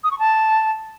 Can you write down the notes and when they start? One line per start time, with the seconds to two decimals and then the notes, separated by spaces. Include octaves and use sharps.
0.03 D#6
0.11 C#6
0.19 A5